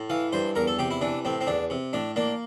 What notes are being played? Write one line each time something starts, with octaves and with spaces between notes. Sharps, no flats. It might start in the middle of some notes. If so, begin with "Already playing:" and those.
Already playing: A2
E3 F5
G2 C5
E2 A#4
A4
C3 G4
E4
E3 D4
A2 C4
C4
E2 D4
C3
A2 D4
A#3 D4